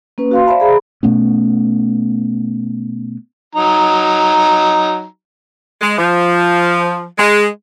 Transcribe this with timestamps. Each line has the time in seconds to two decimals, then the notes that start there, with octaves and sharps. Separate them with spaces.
0.18 A#3 C#4 B4
0.31 F#4 F5 C6
0.46 C5 D5 E5 F5 A5 B5
0.60 G#4 A#5 B5
1.03 B2 A3 B3 C#4
3.55 F#3 D#4 A#5
5.81 G#3
5.98 F3
7.18 G#3